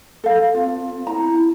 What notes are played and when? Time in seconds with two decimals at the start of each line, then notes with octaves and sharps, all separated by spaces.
0.24 A4 F5
0.55 C4 F4
1.07 E4 A#5